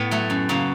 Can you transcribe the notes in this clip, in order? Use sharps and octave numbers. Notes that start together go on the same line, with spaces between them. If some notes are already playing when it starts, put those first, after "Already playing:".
Already playing: A2 B3
F#3 A3
F#2
C#3 F#3 A#3